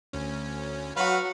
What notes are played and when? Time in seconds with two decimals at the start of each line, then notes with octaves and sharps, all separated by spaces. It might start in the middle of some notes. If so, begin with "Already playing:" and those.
0.13 D2 C#4
0.97 F#3 F#4 B4 F5 B5